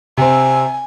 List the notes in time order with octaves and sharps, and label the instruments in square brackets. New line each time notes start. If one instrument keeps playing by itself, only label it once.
[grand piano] C3 C4 [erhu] G#5